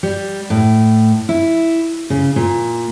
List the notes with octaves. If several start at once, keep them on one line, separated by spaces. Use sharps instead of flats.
G3
A2
E4
C#3
A#2